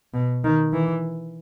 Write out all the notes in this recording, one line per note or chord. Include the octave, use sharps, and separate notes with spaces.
B2
D#3
E3